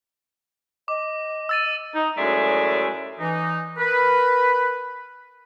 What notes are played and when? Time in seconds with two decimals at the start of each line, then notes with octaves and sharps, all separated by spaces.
0.88 D#5 D6
1.49 E6 A6 D#7
1.95 D#4
2.17 F#2 A2 G#3 D5 E5
3.20 E3 D#4
3.78 A#4 B4